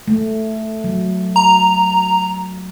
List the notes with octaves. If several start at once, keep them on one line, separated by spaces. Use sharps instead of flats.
A3
F#3
A#5